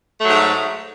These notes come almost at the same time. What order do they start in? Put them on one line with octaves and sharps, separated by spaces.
A3 F#3 G#2